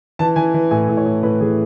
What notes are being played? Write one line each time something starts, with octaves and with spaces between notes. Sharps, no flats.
E3 A5
E3 G#5
E3
A2 G#5
A2
C#5
A2
A2 B4
E3 G#4